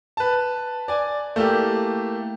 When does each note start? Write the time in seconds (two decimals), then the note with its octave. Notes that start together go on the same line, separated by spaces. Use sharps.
0.17 B4 A5
0.88 D5 G#5
1.36 A3 A#3 E4 G4